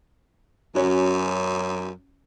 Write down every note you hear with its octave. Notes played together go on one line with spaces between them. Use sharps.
F#2 F#3 C#4 F#4